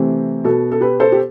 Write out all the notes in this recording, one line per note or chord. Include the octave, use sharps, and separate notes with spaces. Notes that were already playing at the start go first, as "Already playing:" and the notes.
Already playing: C3 E3 A3 C4 G4
B2 B3 A4
A4
G4 B4
A4 C5
G4